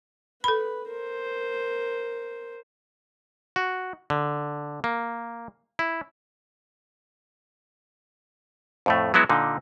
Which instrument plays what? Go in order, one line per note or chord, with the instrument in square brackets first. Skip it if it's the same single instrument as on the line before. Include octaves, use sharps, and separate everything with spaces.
[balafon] A4 B5 [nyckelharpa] B4
[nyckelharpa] A#4 C5
[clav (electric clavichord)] F#4
D3
A#3
E4
F2 A2 A3
F#3 G#3 B3 E4 F#4
A#2 D3 D#4